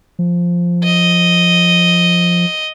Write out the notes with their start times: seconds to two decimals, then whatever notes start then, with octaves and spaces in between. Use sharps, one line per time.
0.19 F3
0.84 D#5